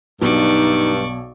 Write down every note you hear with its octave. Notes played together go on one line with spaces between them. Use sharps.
B1 G2 B2 D#4 D5 C#6